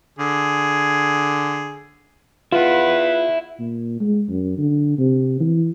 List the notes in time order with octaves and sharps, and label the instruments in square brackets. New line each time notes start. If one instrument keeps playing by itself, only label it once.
[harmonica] D3 G#4
[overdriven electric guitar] E4 F#5 [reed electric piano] F4 [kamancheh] B4
[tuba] A#2
G#3
F#2
D3
C3
E3